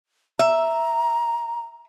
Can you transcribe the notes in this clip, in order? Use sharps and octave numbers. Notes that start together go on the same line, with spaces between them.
E5 A#5